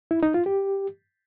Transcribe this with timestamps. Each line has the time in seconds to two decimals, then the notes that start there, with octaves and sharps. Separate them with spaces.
0.11 E4
0.23 D#4
0.34 F4
0.46 G4